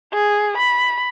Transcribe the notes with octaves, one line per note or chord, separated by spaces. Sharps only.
G#4
B5